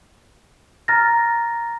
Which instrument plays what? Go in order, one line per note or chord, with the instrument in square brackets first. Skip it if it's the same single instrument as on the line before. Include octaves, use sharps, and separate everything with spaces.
[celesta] A#5 F6 A6 A#6